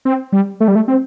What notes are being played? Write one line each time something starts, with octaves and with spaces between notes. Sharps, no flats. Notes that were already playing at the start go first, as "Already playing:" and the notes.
C4
G3
A3
G3
A3
C4